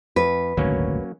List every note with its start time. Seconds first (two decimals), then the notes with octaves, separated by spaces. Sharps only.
0.16 F2 B4
0.57 D#1 G#1 D2 F#3 A#3 C#4